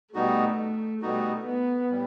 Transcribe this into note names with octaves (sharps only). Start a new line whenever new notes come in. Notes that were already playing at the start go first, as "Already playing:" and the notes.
B2 G3 A3 B3 D#4 F#4
B2 G3 A3 B3 D#4 F#4
B3
A2 G3